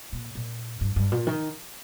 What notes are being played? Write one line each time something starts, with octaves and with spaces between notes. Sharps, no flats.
A#2
A#2
G2
G2
A#2
D#3